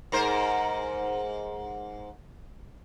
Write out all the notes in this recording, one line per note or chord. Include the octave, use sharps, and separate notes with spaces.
G#2 A#4 C5